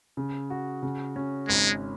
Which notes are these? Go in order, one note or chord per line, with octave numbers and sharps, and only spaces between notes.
C#3
F#4
C#3
C#4
G#1 G#3